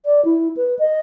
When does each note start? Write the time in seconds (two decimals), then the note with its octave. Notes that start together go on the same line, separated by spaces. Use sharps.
0.06 D5
0.25 E4
0.57 B4
0.79 D#5